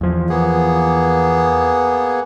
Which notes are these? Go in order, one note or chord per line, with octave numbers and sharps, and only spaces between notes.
E2 F3
A#3 B3 G#4